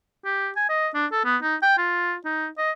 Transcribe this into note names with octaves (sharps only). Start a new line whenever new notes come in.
G4
G#5
D#5
D4
A4
B3
D#4
G5
F4
D#4
D#5